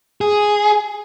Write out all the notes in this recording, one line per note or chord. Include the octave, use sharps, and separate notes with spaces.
G#4